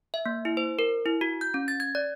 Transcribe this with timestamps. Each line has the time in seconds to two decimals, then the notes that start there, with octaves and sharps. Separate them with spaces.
0.14 E5
0.26 A#3
0.45 E4
0.57 C5
0.79 A#4
1.06 E4
1.21 F#4
1.41 G6
1.54 C#4
1.68 A6
1.80 G#6
1.95 D5